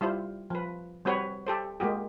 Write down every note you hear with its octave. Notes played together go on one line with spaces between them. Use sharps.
G3 E4 F4 C5
F3 B4
G3 C4 F#4 B4 C#5
G4 A4 C5
G#3 A#3 F#4 G4